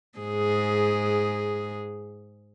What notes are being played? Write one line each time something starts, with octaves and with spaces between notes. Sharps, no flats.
G#2 G#4